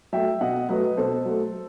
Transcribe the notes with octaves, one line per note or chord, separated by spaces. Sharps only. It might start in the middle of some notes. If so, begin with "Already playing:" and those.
F#3 A3 E5 G5
B2 D#5 F#5
F#3 A3 B4 D#5
B2 A4 C5
F#3 A3